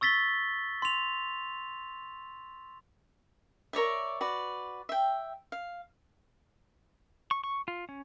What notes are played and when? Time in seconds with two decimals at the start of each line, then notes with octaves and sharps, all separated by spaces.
0.01 C#6 E6 A6 B6 G7
0.82 C6 F7
3.73 A#4 C#5 D5 E5
4.21 F#4 B4 D5
4.89 E5 G5
5.52 F5
7.31 C#6
7.44 C#6
7.68 F4
7.89 C#4